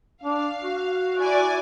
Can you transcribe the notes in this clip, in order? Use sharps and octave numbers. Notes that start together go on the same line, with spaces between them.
D4 F5
F#4
E4 D5 G#5